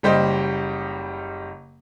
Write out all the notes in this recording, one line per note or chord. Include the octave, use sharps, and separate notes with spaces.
F#1 G3 G4 C5 D#5